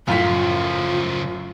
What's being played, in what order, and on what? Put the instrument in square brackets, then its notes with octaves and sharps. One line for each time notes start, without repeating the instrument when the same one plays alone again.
[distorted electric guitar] C#2 F3 [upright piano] F#2 A2 B6 [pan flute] F4 [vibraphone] F5